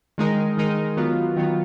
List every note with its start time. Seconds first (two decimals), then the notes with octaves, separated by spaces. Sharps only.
0.18 D#3 G#3 D#4 A#4
0.57 D#3 G#3 D#4 A#4
0.96 D#3 F#3 B3 F4
1.36 D#3 F#3 B3 F4